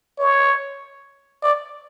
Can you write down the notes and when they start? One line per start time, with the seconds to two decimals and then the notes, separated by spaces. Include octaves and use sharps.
0.19 C#5
1.43 D5